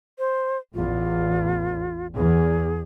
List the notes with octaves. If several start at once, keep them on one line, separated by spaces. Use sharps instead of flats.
C5
A1 E2 F4
E2 G#4